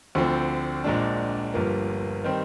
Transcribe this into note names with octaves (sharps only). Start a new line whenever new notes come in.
D2 D3 F3 C4
A#1 A#2 G#3 D4
G1 G2 F3 A#3
D#3 G3 C4